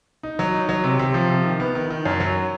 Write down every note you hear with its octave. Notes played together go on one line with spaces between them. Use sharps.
D#4
F#3
D#4
F#3
C3
C3
F3
C3
D#3
B3
D#3
D#3
F#2
F#3